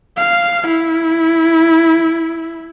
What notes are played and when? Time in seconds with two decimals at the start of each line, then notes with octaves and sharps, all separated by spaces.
0.17 F5
0.67 E4